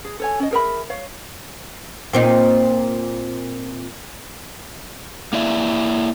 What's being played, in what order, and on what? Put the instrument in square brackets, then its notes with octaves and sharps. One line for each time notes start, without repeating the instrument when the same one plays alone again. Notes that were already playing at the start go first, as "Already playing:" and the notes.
[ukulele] G#4
A4 C#5 G#5
C#4 D#5
G#4 A#4 E5 B5
C#5 F5
[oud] A#2 C4 D#4
[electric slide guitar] A#3 E4 D5 E5